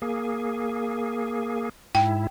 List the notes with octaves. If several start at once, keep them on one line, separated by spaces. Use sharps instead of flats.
A#3 G#4
G#2 E4 G5